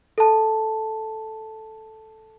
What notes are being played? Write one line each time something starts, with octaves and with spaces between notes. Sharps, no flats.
A4 A5